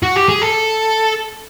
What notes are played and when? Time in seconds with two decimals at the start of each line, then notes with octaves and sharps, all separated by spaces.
0.03 F#4
0.16 G4
0.29 G#4
0.42 A4